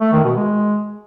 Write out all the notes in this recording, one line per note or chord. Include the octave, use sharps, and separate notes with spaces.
A3
D#3
B2
G#3